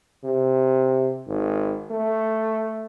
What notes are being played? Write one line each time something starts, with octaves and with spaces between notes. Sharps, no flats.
C3
G#1
A3